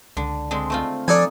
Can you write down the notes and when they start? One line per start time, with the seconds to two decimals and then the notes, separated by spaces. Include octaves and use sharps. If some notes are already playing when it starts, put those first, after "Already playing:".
0.17 C#2 D3
0.51 D3 G#3 C4
0.70 A3 C4 F4
1.08 F3 D4 D#4 A4 G#5